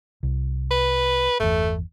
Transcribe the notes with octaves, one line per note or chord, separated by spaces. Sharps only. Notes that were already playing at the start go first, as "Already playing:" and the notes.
C2
B4
G1 E2 A3